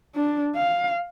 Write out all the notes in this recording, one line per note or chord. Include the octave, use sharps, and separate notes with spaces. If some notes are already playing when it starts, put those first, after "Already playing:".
D4
F5